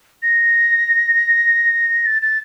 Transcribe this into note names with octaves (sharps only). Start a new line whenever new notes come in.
A#6
A6
A6